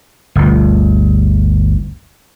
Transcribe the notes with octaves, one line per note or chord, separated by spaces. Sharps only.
G1 D2